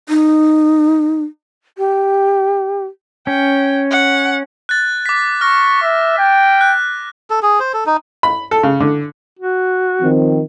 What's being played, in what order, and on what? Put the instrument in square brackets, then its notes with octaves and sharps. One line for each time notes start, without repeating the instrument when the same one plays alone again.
[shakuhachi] D#4
G4
[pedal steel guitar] C#4 [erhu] G5
[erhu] F#5
[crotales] F#6 A6
D6 B6
[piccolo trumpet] C#6 [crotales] F6 A#6
[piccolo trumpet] E5
G5
[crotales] F#6
[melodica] A4
G#4
C5
A4
D#4
[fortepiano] B5
A4
C#3
D3
[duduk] F#4
[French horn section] D#3 F3 C4